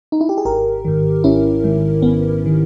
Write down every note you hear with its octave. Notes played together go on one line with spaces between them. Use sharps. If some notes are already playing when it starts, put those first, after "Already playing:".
D#4
E4
G4
G#4
G#1 G4 A#4
G#2 D#3
G#1 C#4 E4
G#2 D#3
G#1 B3
D#3